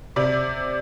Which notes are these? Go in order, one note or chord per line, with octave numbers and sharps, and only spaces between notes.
C3 D5